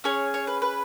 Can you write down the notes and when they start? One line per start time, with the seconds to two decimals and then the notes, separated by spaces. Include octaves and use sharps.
0.04 C#4 G#4 C#5
0.34 C#5
0.47 B4
0.62 B4